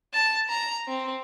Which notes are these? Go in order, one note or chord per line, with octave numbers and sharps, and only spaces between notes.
A5
A#5
C4